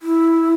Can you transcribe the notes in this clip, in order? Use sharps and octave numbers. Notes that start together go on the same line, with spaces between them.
E4